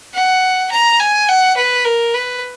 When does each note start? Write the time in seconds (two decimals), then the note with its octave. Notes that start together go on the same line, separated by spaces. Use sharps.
0.14 F#5
0.71 A#5
1.00 G#5
1.29 F#5
1.57 B4
1.85 A#4
2.14 B4